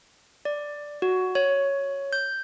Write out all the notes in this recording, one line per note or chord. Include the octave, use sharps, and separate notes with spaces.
D5
F#4
C#5
G6